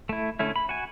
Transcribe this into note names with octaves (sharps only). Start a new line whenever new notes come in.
A3 E4
D3 A3 C#4 E4
B5
F#4 G#5